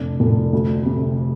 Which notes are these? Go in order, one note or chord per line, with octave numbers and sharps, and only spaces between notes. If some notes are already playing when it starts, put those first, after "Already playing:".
Already playing: F1 D4
F1
D2
C3